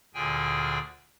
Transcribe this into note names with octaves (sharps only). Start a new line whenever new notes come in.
D2 A#2 D3 G#4 G5 G#5